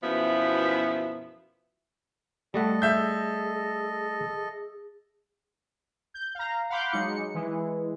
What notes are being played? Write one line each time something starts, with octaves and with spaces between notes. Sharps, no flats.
F#2 B2 F3 B3 E4 E5
G3 A3 A4 D#5 F#5
G#4 E5 G6
G6
F5 A#5
F5 F#5 B5 C6 D6 G6
F#3 G#3 D#4 C#7
E3 G#3